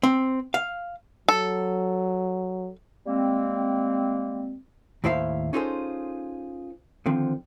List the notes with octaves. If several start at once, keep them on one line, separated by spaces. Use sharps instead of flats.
C4
F5
F#3 A4
G3 G#3 A#3 C4
D#2 A2 E4 C5 E5 F5
C#4 D#4 F4 G#4 A4 C5
D3 D#3 F3 C4